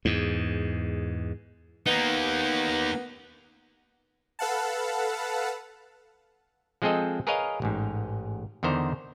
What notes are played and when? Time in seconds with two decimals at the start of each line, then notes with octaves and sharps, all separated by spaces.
0.05 E2 G#2
1.86 A#3 B3 D#4
4.39 A4 B4 F5 F#5 A5
6.82 F3 G#3 C4 G#4 A4 D#5
7.27 G#4 A#4 B4 C#5 D#5 F5
7.62 A1 G#2
8.63 E2 D3 D#3 C5 A#5